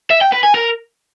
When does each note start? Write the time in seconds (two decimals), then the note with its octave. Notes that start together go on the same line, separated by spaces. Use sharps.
0.10 E5
0.21 G5
0.32 B4
0.43 G#5
0.54 A#4